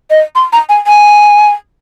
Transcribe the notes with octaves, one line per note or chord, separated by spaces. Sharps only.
D#5
C6
A#5
G#5
G#5